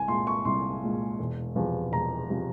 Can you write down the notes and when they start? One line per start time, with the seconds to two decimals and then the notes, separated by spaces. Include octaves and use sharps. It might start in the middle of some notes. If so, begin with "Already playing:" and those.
Already playing: C2 G#5
0.08 A#2 G#3 C6
0.27 C#6
0.45 C2 C6
0.83 A#2 G#3
1.19 E1
1.55 E2 C3 F3
1.92 E1 A#5
2.30 C3 F3